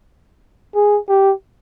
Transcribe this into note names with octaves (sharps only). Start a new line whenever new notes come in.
G#4
G4